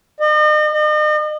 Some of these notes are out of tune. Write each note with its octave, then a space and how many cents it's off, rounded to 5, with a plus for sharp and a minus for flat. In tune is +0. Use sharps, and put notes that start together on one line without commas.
D#5 -40
D#5 -40